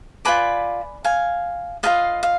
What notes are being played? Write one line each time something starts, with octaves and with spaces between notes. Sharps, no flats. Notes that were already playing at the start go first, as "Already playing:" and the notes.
F4 B4 D5 G#5 B5
F5 G#5
F4 G#4 B4 D#5 F5
F5